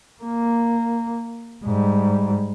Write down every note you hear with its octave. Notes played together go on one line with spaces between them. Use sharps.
A#3
G#2 G3